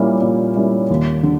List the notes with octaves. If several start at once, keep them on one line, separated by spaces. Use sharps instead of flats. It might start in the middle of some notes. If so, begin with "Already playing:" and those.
Already playing: A#2 G3 A#3 C#4 E4
A#2
G3 A#3 C#4 E4
D#2
D3